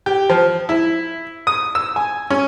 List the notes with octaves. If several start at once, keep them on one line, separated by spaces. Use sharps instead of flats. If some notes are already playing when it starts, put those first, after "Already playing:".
G4
F3
E4
D#6
E6
G#5
C#4